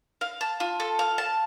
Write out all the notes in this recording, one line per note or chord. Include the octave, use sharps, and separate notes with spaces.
F5
A5
F4
A4
F5
A5